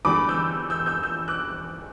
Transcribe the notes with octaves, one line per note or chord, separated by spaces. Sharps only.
E2 D3 G3 B5 D6
E6 G6
E6 G6
E6 G6
E6 G6
D6 F#6